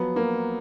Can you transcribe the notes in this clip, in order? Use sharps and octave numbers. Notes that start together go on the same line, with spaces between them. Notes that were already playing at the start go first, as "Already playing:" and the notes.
Already playing: F3 F#3 B3
F#3 A#3